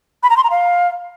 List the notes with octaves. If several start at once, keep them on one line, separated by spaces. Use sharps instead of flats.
B5
A#5
C6
A#5
F5